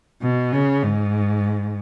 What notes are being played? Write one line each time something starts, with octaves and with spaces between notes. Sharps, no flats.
B2
C#3
G#2